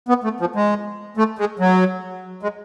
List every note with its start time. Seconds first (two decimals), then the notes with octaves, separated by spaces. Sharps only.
0.09 B3
0.24 A3
0.40 F3
0.56 G#3
1.17 A3
1.39 G#3
1.59 F#3
2.43 G#3